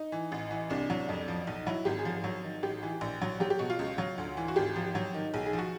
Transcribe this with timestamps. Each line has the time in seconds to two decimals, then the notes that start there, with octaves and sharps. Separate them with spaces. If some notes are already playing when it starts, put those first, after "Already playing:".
Already playing: D#4
0.12 E3
0.32 A1
0.51 E3
0.70 C2 D4
0.90 F#3
1.09 F2
1.28 F3
1.47 B1 D#4
1.66 F#3 E4
1.85 G#1 G4
1.99 G#4
2.05 F3
2.24 F#3
2.44 D#3
2.63 A1 G4
2.83 E3
3.01 A#1
3.21 F#3
3.40 F#3 G4
3.50 G4
3.59 B2 F#4
3.70 F4
3.79 C#2
3.98 F#3
4.18 D2
4.37 E3
4.48 F#4
4.56 G#1 G4
4.76 F3
4.95 F#3
5.14 D#3
5.34 B1 G#4
5.46 G#4
5.53 F3
5.58 F#4